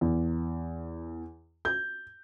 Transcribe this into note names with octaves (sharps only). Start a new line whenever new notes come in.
E2
G6